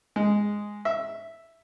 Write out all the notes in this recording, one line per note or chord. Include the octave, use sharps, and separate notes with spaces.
G#3
E5